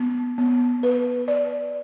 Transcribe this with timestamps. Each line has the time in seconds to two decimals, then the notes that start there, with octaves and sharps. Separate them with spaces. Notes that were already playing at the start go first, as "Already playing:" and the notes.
Already playing: B3
0.38 B3
0.83 B4
1.28 D5